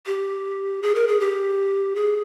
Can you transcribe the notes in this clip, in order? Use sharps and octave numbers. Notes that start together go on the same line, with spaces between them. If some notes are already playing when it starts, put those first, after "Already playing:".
G4
G#4
A#4
G#4
G4
G#4